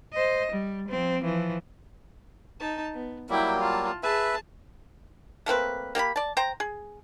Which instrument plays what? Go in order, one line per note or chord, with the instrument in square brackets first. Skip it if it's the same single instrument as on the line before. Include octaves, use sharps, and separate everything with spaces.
[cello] C5 D#5
G3
F3 C4
E3 F3
[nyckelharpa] D#4 A5
B3
[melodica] F#3 G3 A#3 [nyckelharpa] E4 G5
[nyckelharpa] F4 A5
[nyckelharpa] G#4 A5 [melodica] B4 E5
[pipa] A3 A#3 C4 B4
A#3 G4 D5 B5
D5 A5
C5 G5 A#5
G#4